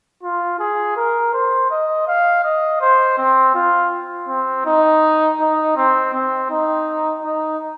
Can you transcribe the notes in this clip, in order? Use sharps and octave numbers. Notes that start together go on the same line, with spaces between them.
F4
G#4
A#4
C5
D#5
F5
D#5
C5
C4
F4
C4
D#4
D#4
C4
C4
D#4
D#4